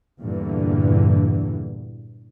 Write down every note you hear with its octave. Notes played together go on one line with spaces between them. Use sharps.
E2 G2 A#2 D3 E3